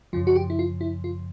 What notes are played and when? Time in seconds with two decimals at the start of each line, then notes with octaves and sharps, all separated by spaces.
0.13 F#2 C#3 F3 F4
0.27 F#4
0.36 G4
0.50 E4
0.59 F4
0.81 E4
1.04 F4